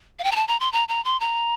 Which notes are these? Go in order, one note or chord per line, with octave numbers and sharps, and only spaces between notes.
F5
G5
A#5
A5
A#5
C6
A#5
A#5
C6
A#5